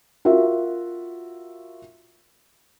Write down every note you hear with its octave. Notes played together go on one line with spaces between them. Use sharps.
F4 F#4 A#4 E5